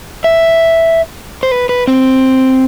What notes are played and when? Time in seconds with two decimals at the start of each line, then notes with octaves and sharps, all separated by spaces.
0.24 E5
1.43 C5
1.51 B4
1.69 B4
1.87 C4